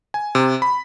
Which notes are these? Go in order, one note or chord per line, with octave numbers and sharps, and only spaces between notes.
G#5
C3
B5